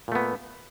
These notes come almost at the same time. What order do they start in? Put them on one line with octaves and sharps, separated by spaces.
A#2 A3 B3